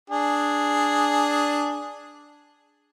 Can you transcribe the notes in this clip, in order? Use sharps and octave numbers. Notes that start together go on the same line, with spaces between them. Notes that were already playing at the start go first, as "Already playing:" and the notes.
D4 G#4